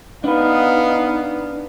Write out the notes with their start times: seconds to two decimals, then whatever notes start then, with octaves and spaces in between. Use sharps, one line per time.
0.24 B3 D4 D#4 B4 F5